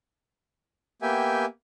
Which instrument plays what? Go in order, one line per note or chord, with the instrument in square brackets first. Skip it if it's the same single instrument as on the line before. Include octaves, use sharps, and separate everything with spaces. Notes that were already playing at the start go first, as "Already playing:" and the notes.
[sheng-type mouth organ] A#3 B3 G4 E5 G5 G#5